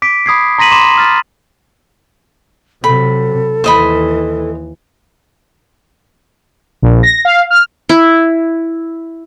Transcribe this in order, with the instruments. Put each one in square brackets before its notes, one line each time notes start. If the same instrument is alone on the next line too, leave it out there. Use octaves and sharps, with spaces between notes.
[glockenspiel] D6 B6 D7
B5 D#6 G#6 C7
A#5 C6 A#6 B6 D#7 F#7
B5 C6 D6 E7 F#7
D#6 F6 A6
[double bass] C3 F#3 [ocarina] A4 [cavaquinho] B5
[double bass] D#2 E3 [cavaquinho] C5 D#5 B5
[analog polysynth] A#1
A#6
F5
F6
[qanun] E4